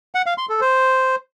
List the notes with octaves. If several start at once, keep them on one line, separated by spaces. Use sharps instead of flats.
F#5
F5
C6
A4
C5